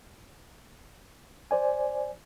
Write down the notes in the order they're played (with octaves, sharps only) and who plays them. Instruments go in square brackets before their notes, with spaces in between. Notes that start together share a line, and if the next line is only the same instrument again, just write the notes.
[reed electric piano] C5 D5 G#5